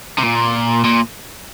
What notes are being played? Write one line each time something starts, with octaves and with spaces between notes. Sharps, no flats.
C3
A#2
A#2